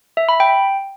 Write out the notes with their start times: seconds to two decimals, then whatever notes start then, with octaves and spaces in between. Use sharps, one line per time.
0.17 E5
0.29 B5
0.40 G5